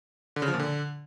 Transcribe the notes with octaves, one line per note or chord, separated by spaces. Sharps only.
D3
C#3
F3
A#2
D3